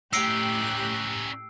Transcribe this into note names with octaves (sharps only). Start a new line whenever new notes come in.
A2 C#4 D#4 G4 E6 F#6 C7 D7